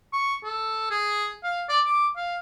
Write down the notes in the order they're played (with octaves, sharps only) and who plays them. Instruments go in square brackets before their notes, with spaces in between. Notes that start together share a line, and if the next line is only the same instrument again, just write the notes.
[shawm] C#6
A4
G#4
F5
D5
D6
F5